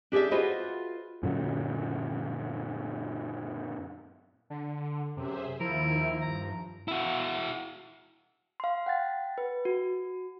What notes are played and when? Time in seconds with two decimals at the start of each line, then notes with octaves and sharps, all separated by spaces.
0.12 D4 G4 G#4 D5 E5
0.31 F4 F#4 G#4 B4 C5 D#5
1.23 F#2 A#2 D3 F#3
4.50 D3
5.17 F#2 C3 G#4 C5 E5
5.60 D#2 D#3 F3 E4 A#4
6.21 G2 A#5
6.88 E4 F#4
8.60 F5 C6
8.86 F#5 G5 A6
9.38 B4
9.65 F#4